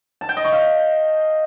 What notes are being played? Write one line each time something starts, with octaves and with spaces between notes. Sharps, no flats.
A5
G5
D#5
C#6
F5